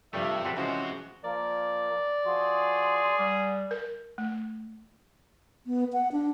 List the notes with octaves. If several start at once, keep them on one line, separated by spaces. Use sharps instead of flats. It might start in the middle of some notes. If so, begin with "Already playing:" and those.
G2 C3 F3 G3 A3 E5
C4 F#4 A4 B4
C3 E3 F3 G#3 C#4 F#4 C5
F3 A#3 A#4 D5
F3 F#4 G#4 C6
G3 F#5 F6
A#4
A3
B3
F#5
D4